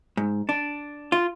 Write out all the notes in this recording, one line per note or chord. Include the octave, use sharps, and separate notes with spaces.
G#2
D4
F4